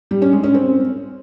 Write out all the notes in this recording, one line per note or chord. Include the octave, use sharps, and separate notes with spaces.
G3
C#4
G#3
C#4
C4